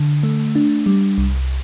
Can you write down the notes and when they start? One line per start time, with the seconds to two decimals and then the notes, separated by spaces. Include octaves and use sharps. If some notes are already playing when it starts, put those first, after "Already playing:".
Already playing: D3
0.23 A3
0.55 D4
0.86 G3
1.18 C2